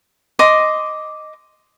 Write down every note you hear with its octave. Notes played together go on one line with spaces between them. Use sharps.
D#5 C6 D6